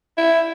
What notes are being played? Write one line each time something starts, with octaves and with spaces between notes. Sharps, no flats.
E4